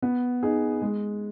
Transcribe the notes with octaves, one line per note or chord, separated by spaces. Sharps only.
B3
D#4 G#4
G#3